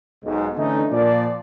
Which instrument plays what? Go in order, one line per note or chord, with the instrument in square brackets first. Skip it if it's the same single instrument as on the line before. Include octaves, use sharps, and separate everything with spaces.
[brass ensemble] B1 G#2
D3 E3 A3 C#4 D#4
A#2 F3 D5